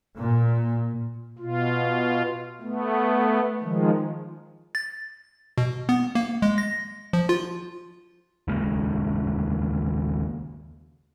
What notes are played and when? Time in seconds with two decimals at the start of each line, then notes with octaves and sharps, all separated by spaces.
0.18 A#2
1.39 B2 F4
2.61 A3 B3
3.61 D#3 F3 G#3
4.75 A6
5.58 B2
5.89 B3
6.15 A#3
6.42 G#3
6.58 A#6
7.13 F3
7.29 F4
8.48 D#2 C#3 G#3 A#3